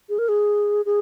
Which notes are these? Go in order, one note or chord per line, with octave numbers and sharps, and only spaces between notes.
G#4
A#4
G#4
G#4